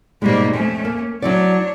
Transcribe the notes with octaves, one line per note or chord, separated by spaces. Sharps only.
G#2 B2 G3 G#3 A#3
F2 A3 C#4
A#3
F#3 D4 E4 C#5 D5